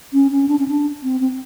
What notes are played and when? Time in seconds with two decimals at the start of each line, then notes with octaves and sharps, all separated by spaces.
0.13 C#4
0.31 C#4
0.48 D4
0.59 C#4
0.68 D4
1.03 C4
1.21 C4